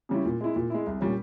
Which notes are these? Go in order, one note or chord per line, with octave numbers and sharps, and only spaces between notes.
C#3 G3 C#4 E4
A#2
G#3 E4
A#2
G#3 E4
C2
A#2 G3 C#4